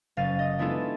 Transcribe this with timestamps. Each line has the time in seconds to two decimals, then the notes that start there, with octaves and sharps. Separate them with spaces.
0.17 F#1 F5 A6 D#7
0.39 D#5 D#6
0.59 G#3 B3 D4 E4 F4 A4